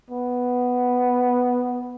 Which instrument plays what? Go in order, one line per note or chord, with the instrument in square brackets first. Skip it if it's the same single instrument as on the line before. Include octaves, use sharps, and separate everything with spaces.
[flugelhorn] B3